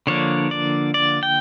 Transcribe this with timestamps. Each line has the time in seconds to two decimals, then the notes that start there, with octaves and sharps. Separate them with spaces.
0.07 D3 F3 A#3 D4 C#5
0.51 D5
0.94 D5
1.23 G5